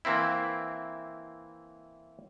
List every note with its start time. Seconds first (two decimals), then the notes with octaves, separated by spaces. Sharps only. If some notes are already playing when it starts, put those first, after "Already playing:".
0.05 E3 A#3 C4 E4